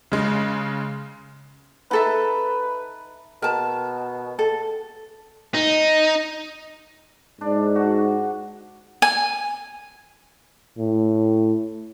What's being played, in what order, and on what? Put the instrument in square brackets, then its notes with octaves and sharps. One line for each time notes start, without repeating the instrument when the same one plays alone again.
[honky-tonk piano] C#3 G#3
[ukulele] D#4 A4 E5 [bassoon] B4
[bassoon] B2 [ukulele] A#4 A5
[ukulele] A4
[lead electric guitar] D#4
[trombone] G#2 [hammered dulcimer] D4
[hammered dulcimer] F#4
[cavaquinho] G#5
[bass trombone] A2